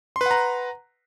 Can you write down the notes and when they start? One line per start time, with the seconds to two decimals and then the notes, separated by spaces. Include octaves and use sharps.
0.16 C6
0.21 B4
0.26 F#5
0.31 A#5